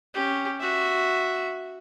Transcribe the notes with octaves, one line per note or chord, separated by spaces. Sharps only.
C#4 G4
F#4 E5